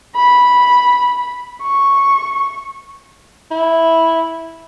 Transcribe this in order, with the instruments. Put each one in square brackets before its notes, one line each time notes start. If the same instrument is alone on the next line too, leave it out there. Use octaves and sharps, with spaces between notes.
[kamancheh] B5
C#6
[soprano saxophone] E4